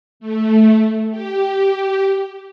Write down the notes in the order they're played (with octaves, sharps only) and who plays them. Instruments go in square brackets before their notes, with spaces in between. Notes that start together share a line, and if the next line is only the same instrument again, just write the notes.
[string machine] A3
G4